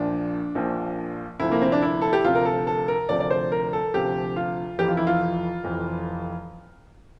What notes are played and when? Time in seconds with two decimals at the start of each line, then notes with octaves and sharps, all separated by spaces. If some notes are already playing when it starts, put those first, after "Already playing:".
Already playing: A#1 A#2 F3 D4
0.55 A#1 A#2 F3
1.40 D2 C3 F3 E4
1.52 A#3
1.62 C4
1.72 D4
1.82 E4
2.01 A4
2.13 G4
2.24 D2 C3 F3 F4
2.35 A#4
2.45 A4
2.67 A4
2.88 A#4
3.09 D2 C3 F3 D5
3.20 D5
3.30 C5
3.52 A#4
3.73 A4
3.94 D2 C3 F3 G4
4.36 F4
4.78 F1 F2 E3 G4
4.88 F4
4.97 E4
5.07 F4
5.63 F1 F2 E3